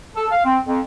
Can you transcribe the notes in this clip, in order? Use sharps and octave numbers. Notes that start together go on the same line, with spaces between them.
A4
F5
C4
F2